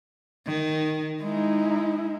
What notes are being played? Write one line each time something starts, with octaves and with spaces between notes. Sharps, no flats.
D#3
G#3 D#4 E4